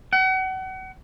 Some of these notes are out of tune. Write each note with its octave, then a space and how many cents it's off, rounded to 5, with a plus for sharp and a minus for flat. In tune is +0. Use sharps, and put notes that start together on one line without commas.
F#5 +35